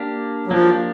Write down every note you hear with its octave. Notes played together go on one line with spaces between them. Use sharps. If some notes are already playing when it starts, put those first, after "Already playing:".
Already playing: A#3 D4 G4
F#3
F3 A#3 D4 G4